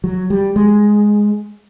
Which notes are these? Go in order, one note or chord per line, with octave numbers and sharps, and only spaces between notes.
F#3
G3
G#3